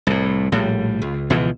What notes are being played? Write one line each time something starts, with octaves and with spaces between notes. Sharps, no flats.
C2 A2
A#1 A2 G3
C#2
C#2 B2 E3 F3